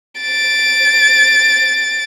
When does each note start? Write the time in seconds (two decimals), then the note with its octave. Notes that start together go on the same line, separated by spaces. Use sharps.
0.21 A6 D7